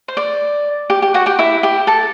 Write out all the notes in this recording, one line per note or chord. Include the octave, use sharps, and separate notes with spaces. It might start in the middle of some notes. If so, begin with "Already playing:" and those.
C5
D5
G4
G4
F#4 F#5
G4 G5
E4 E5
G4 G5
A4 A5